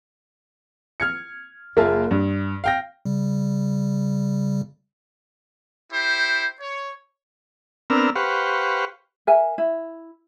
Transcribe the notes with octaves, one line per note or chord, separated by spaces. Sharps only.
F6 G#6 C#7
F#1 A#3 F4 G#4 E5 A5
G2
F5 G5 A#6
C#3 G3
E4 G4 C5
C#5
B3 C4 D4 A#4 E6 F6
G4 B4 C5 F5 F#5 C#6
A#4 E5 G#5
E4